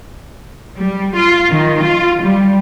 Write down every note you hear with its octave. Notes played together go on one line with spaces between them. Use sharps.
G3
F4
D#3
F4
G3